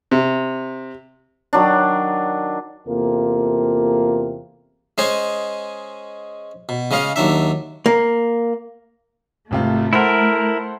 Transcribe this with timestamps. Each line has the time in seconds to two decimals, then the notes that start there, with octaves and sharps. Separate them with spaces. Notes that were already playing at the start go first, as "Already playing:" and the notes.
0.11 C3
1.53 D#3 F#3 D4
2.87 E2 C3 A#3 F4 A4 A#4
4.98 G#3 C#4 C5 D#5 G#5
6.69 B2
6.91 C#3 G#3 C#4 D#5 F5
7.16 D#2 F#3 D4 E5
7.86 A#3
9.51 G#1 C3 A3 F4
9.93 E4 A4 A#4 C5 F#5